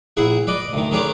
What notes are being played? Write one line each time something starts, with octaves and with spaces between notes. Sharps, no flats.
A#1 E4 G#4 F#5
B4 D5 D#5
D2 D#3
D#3 A3 C#4 G#4 B4 D5